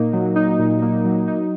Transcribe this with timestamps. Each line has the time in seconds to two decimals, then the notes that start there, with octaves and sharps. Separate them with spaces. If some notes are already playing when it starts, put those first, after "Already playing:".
Already playing: A#2 A#3 D#4
0.13 F#3
0.36 D#4
0.59 A#2
0.82 A#3
1.05 F#3
1.28 D#4